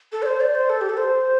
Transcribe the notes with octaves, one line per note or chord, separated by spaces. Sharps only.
A4
D5
C5
D5
C5
A4
G4
A4
C5